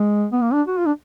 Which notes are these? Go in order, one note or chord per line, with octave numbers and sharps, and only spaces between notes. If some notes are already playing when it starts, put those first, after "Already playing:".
Already playing: G#3
B3
A#3
D4
F#4
F4
D4